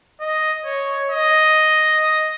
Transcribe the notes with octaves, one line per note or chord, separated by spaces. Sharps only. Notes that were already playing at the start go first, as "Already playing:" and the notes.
D#5
C#5
D#5